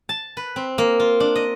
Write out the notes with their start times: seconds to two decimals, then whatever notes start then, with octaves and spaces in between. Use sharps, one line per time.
0.09 A5
0.37 B4
0.56 C4
0.78 A#3
1.00 F4
1.20 D4
1.35 D#5